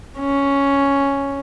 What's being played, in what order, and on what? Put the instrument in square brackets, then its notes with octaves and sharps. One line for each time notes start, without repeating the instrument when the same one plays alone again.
[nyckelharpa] C#4